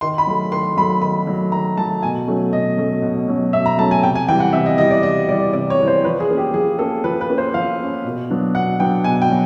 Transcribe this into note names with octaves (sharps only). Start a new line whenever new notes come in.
D#3 C6
B5
F#3 A3
D#3 C6
F#3 A3 B5
D#3 B5
F#3 A3
D#3 A#5
F#3 A3 A5
B2 G#5
F#3 A3 C#4
B2 D#5
F#3 A3 C#4
B2
F#3 A3 C#4
B2 E5
A#5
F#3 A3 C#4 A5
G#5
C3 G5
G#5
E3 G3 G5
F#5
C3 E5
D#5
E3 G3 D#5
D5
C3 D#5
E3 G3 D5
C3 D5
C#5
E3 G3
C5
F3 B4
G#4
A#3 C#4
G4
F3 G#4
A#3 C#4 A4
F3 B4
B4
A#3 C#4
C5
F3 F5
A#3 C#4
B2
F#3 B3 D4
B2 F#5
F#3 B3 D4 G5
B2 G#5
G5
F#3